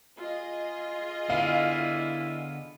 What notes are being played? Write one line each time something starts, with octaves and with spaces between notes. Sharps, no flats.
F4 G#4 D#5
D3 B3 E4 F5